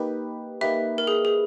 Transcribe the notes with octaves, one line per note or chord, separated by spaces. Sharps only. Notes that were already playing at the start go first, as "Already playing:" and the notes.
Already playing: A#3 D#4 G4 B4
A#3 D#4 G4 B4 E5
A#4
G#4
G#4